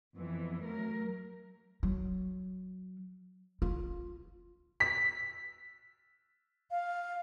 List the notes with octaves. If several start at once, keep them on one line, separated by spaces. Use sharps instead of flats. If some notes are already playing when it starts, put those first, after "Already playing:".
F2 E3 B3
F#3 A3 A#4
F#3
F4
B6
F5